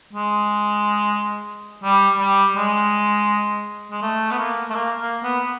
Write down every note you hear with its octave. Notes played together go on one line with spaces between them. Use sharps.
G#3
G3
G3
G#3
G#3
A3
B3
A#3
A3
A#3
A#3
B3